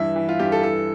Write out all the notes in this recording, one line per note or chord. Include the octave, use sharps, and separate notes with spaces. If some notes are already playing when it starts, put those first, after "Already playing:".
Already playing: G2 E3 E5
E3
F4
G2 G4
A4
E3 A4